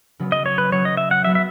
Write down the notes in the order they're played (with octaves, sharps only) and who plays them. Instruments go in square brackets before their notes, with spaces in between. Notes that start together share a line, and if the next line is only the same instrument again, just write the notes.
[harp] C#3 F#3 B3
[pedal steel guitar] D#5
C#5
B4
[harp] C#3 F#3 B3 [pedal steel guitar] C#5
[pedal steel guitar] D#5
E5
F#5
[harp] C#3 F#3 B3 [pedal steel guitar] E5
[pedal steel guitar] E5